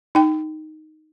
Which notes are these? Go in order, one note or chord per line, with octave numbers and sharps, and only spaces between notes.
D#4 G5